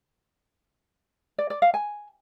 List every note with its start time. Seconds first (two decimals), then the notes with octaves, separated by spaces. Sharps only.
1.38 D5
1.50 D5
1.62 F5
1.74 G#5